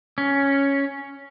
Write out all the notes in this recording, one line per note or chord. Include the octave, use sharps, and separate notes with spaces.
C#4